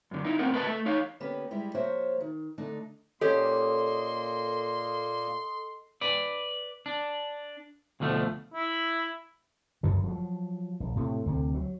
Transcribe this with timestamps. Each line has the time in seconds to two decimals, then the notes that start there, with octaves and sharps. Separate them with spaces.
0.11 F#2 D3
0.24 D#4 E4
0.39 A2 B3 C4 A#4 F#5
0.53 A#2 B4 C5 D#5 A5
0.67 A3 E5
0.86 D#4 C#5 F5
1.20 D3 A#3 B3 C#4 G4 B4
1.51 G3 G#3 E4 G4
1.75 F3 A#3 F#4 C5 C#5 E5
2.20 D#3
2.58 D3 A3 D4 D#4
3.21 A#2 A#3 C#4 G4 A4 D#5 C6 D#6
6.01 B4 D5
6.86 D4
8.00 D2 B2 F3 A3
8.54 E4
9.83 F#2 D3
10.04 F3 F#3
10.80 A#1
10.96 A2 C3 A3
11.26 D2 C3
11.55 F#3